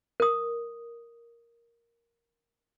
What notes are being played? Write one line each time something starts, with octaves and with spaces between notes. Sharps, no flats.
A#4 D#6